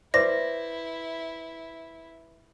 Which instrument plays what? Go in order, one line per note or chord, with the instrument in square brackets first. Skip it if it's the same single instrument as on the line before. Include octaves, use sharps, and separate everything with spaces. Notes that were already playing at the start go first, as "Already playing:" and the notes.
[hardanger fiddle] E4 [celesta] B4 E5 [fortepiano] C5 D5 [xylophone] A#6